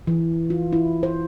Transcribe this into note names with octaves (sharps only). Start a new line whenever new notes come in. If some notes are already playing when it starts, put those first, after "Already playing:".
E3
F4
E4
C5